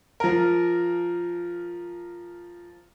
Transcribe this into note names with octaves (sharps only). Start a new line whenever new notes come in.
F3 A#4